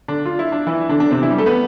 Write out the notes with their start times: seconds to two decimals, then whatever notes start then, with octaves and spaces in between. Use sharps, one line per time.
0.08 D3 D4
0.26 F4
0.39 E4
0.52 D4
0.67 E3 E4
0.89 D3 D4
1.00 D3 D4
1.11 C3 C4
1.22 E3 E4
1.30 G3 G4
1.38 A3 A4
1.46 B3 B4